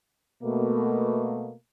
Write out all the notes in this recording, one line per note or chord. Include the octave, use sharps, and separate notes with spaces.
B2 A3 A#3